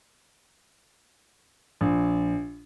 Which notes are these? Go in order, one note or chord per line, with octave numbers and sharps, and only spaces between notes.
A#1